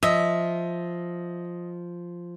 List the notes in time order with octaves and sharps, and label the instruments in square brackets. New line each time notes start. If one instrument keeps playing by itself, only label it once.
[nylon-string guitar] F3 [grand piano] D#5 [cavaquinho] E5